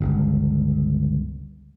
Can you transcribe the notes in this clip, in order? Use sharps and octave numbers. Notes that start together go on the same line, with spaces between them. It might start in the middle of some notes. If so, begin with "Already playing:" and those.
G1 C#2